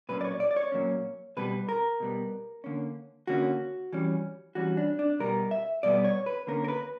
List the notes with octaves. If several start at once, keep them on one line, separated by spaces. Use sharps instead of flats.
A#2 F#3 A#3 C#4 B4
D5
C#5
D5
D5
C#5
A#2 F#3 A#3 C#4
B2 G3 B3 B4
A#4
B2 G3 B3
D3 A#3 C#4
D3 A#3 C#4 F#4
E3 G3 C#4
E3 G3 C#4 F#4
D4
D4
B2 G3 B3 A#4
E5
B2 G3 B3 D5
C#5
B4
D3 A#3 C#4 A#4
A#4
B4